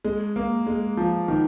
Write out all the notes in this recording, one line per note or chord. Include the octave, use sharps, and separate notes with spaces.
G#3
A#3
G#3
F3
D#3